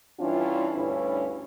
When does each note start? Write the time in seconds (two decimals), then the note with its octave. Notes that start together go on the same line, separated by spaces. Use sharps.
0.20 G2 E3 C#4 D4 E4 F4
0.74 D2 G2 C#4 E4 B4